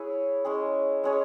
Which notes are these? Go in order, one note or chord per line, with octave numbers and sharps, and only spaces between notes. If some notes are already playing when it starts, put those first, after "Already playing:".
Already playing: E4 G#4 B4 C#5
G#3 C#4 G#4
G#3 C#4 G#4 C#5